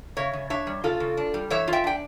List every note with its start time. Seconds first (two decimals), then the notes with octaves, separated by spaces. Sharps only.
0.17 C#3 C#5 E5
0.33 C#3
0.50 D4 C#5 E5
0.67 G3
0.84 C#3 F4 A4
1.00 C#3
1.17 D4
1.34 G3
1.50 E3 C#5 E5
1.67 F4
1.73 E5 G5
1.84 D4 G5